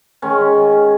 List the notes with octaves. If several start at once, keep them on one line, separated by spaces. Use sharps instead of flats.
D#3 G#3 C#4